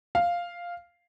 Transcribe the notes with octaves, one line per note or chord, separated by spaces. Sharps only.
F5